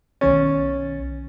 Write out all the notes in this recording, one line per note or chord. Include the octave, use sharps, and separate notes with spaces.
B1 D#3 C#4 A6